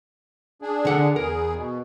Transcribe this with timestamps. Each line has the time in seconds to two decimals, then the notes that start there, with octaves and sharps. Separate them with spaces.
0.62 D4 G#4
0.85 D3 F#5
1.16 E2 G#4 A#4
1.55 B2